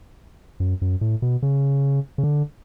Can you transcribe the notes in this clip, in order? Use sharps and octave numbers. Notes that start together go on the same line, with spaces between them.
F#2
F#2
A2
B2
C#3
C#3
D3